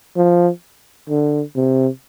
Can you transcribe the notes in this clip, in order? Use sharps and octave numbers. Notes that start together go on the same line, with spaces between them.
F3
D3
C3